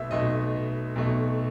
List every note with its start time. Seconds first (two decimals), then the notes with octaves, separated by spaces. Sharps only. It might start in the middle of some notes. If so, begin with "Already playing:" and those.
Already playing: B1 B2 A3 E5
0.11 B1 B2 A3 D#5
0.96 B1 B2 A3